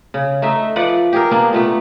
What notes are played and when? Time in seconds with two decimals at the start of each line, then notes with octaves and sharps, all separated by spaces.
0.14 C#3
0.42 A3 D#4 E5
0.76 F3 B4 D5 F#5
1.13 G4 G#4 A#4
1.31 A#3 B3 D4
1.53 A#2 A3 B3